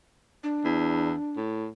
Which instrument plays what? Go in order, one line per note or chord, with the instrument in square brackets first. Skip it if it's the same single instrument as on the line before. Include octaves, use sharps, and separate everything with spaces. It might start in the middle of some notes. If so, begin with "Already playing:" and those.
[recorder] D4
[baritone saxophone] E2
A2